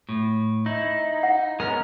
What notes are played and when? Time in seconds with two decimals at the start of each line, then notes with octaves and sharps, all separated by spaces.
0.09 A2
0.66 D#4 E4
1.23 F#5
1.60 G#3 B3 C#4 A#4